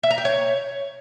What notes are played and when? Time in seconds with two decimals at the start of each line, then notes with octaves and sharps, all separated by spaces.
0.03 E5
0.11 A#5
0.18 G5
0.25 C#5